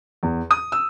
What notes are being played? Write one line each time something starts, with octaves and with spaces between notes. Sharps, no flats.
E2
D#6
E6